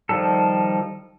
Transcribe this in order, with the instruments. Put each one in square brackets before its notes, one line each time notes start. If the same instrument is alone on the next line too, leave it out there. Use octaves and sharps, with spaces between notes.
[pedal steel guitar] D#3 F3 G3 A4